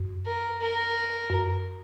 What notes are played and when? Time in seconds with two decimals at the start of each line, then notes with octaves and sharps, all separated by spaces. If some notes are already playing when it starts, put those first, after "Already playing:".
Already playing: F#2
0.26 A#4
0.61 A#4
1.30 F#2